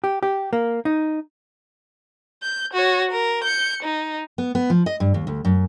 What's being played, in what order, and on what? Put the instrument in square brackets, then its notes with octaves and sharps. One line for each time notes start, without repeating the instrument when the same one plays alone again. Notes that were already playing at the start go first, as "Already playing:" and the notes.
[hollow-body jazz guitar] G4
G4
A#3
D#4
[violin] G6
F#4 C#5
A#4
G6 C#7
D#4
[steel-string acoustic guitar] B3
B3
F3
D#5
G2
D#2
D2
F#2